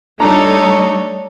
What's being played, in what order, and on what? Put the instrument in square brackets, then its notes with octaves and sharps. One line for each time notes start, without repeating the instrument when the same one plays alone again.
[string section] G3 A3 D#4 [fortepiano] D4 A#5 [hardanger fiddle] A4 C#5